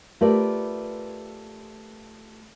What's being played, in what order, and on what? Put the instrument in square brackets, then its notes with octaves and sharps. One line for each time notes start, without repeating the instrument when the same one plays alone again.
[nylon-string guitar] A3 F4 G4 A#4 B4 D5